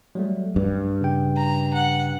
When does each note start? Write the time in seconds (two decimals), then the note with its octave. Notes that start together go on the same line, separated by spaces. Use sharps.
0.15 F#3 G3 A3
0.56 A#1 G2
1.01 C#3 G5
1.37 A#5
1.74 F#5